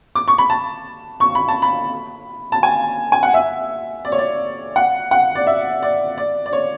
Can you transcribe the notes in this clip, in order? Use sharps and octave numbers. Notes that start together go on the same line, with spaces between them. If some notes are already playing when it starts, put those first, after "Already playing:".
D6
C#6
B5
A5
C#6
B5
A5
B5
A5
G#5
G#5
F#5
E5
D5
C#5
D5
F#5
F#5
D5
E5
D5
D5
D5
C#5